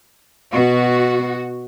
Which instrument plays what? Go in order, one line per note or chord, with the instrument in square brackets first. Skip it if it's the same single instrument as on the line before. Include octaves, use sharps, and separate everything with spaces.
[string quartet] B2 [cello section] F#4